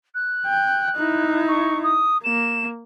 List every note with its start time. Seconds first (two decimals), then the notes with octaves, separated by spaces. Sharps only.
0.14 F#6
0.46 G5
0.96 D#4 E4
1.48 C#6
1.83 D#6
2.24 A#3 E7